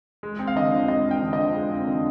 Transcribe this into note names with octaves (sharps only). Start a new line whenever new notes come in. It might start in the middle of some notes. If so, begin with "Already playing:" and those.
G#3
C4
F5
D3 D#5
F2
G#3 D#5
C4
G5
D3
D#5
F2
G#3
C4
D3